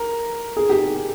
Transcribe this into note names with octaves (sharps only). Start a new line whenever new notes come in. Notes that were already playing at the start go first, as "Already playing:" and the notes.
Already playing: A#4
G#4
G4